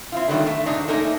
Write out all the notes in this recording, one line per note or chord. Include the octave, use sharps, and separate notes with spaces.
C4 E4 F4
B2 D#3 F#3 G3 A3 D4
A3
G#2 C3 F#3 D4 D#4 F#4
A3 A#3 C#4 D#4 A4 A#4